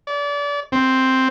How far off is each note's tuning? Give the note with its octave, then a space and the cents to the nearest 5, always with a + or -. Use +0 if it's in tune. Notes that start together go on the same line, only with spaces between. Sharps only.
D5 -30
C4 +0